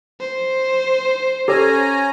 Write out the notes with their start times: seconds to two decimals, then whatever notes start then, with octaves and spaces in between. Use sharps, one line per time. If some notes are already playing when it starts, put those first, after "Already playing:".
0.20 C5
1.48 C#4 G4 A4 C#5 G#5 A#5